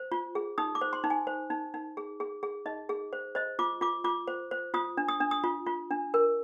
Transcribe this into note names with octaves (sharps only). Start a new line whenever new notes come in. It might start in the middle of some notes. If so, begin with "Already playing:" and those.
Already playing: C5
F4
G#4
D#4 D#6
D6
C5
C6
D#4
G#5
C5
D#4
D#4
G#4
G#4
G#4
D#4 D#5
G#4
C5
C5 D#5
F4 D6
F4 D6
F4 D6
C5
C5
F4 D#6
D4
D#6
D4
D#6
F4
F4
D4
A#4